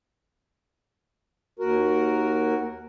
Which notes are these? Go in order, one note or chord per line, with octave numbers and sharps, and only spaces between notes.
D#2 F#4 A#4